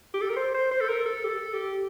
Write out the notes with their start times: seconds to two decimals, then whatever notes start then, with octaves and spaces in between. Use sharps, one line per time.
0.14 G4
0.21 A4
0.29 A#4
0.36 C5
0.54 C5
0.71 C5
0.81 A4
0.89 A#4
1.06 A4
1.24 G4
1.29 A4
1.53 G4